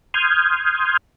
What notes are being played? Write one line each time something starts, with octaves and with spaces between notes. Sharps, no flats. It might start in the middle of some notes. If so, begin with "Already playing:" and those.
C6 D#6 F6 G6 G#6